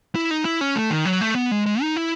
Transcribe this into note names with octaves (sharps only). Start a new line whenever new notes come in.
E4
D#4
E4
C#4
A3
D#3
F#3
A3
B3
G#3
G#3
D#4
E4